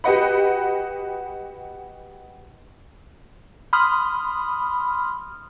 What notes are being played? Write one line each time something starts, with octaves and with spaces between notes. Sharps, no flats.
F#4 G4 B4 D#5 F#5 B5
B5 C6 D#6 F6